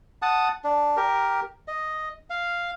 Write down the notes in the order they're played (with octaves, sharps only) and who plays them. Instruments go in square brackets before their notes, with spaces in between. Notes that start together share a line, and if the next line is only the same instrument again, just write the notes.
[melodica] F#5 A5 D#6
D4
G4 A#4
D#5
F5